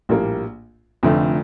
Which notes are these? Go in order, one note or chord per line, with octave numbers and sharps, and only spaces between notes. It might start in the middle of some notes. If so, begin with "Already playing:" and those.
A#1 A2 G3 A#3
F1 F2 D3 A3